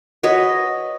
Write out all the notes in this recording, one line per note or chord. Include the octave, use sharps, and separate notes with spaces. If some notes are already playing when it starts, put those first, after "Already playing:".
F#4 B4 C#5 D#5